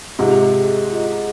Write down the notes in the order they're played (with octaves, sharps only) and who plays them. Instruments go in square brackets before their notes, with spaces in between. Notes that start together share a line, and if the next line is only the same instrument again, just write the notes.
[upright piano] G#2 C3 [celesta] F4 G#4 D#5 A#5
[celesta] F4 G#4 D#5 A#5